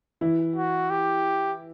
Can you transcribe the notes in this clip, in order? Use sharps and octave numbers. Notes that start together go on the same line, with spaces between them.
E3 E4
F#4
G4